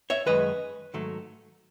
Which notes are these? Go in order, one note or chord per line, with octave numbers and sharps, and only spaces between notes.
C#5 E5
F#2 D#3 G#3 B4 D#5
G#2 D#3 F#3 A3